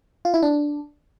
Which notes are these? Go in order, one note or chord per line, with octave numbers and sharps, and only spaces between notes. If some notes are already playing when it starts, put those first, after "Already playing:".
F4
E4
D4